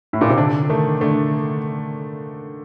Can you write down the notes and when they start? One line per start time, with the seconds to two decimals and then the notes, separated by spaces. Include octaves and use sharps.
0.13 A2
0.21 A#2
0.29 C3
0.38 D3 D4
0.70 D#3 A3
1.01 D3 A3